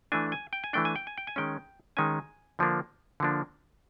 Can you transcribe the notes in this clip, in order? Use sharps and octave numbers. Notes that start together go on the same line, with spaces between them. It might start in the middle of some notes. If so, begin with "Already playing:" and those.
E3 A3 D4 G#5
G#5
G5
G#5
E3 A3 D4 G5
G#5
G5
G#5
G5
G#5
D#3 G#3 C#4 G5
D#3 G#3 C#4 G#5
D3 F3 A#3 D4
D3 F3 A#3 D4